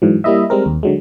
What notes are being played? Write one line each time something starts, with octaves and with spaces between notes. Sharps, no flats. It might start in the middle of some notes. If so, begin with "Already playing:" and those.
G#2 E3 F#3
G3 A#3 E4 D#5 E5
G3 G#3 C4 A#4
D#2
D3 F#3 G#3